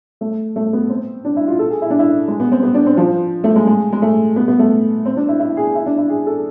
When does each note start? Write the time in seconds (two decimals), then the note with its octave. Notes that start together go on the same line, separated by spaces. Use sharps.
0.21 A3
0.56 A3
0.73 B3
0.89 C4
1.25 D4
1.36 E4
1.48 F4
1.59 A4
1.70 G#4
1.82 E4
1.90 D4
1.99 E4
2.28 G#3
2.40 B3
2.52 C4
2.63 B3
2.74 D4
2.86 C4
2.97 F3
3.44 A3
3.56 G#3
3.67 G#3
3.93 G#3
4.02 A3
4.36 B3
4.48 B3
4.59 A3
5.05 C4
5.17 D4
5.29 E4
5.40 E4
5.57 G#4
5.75 E4
5.86 D4
5.98 E4
6.09 G#4
6.27 A4